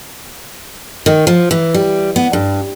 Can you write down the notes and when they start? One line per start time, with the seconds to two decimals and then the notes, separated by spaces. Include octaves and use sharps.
1.06 D#3
1.27 F3
1.51 E3
1.74 G3
2.16 B3
2.33 G2